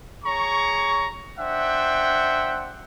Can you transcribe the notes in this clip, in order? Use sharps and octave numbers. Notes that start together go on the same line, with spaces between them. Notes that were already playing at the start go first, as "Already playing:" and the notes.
G#4 C#5 A#5 C#6
D4 C5 E5 F#5 G5